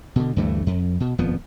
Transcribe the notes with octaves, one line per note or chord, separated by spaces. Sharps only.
B2 D3
D2 G2 E3 A3
F2
B2
D#1 F2 F3 B3